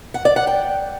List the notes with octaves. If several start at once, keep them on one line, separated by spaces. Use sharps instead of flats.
F#5
D5
F#5
G5